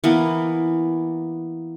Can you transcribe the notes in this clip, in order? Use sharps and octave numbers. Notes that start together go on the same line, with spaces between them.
E3 A#3 B3